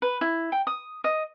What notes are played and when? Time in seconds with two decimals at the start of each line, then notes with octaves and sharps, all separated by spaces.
0.02 B4
0.21 E4
0.52 G5
0.67 D#6
1.04 D#5